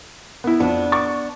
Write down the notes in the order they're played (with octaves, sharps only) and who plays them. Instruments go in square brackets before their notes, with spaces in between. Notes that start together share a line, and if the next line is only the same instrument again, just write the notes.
[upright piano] B3 E4
[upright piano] F2 [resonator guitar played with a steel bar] B3 D4
[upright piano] C#6 D6 A6